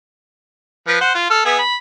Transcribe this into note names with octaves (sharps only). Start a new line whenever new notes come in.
F3 B4
C5 F#5
F4
A4 F6
B3 G#4 E5
B5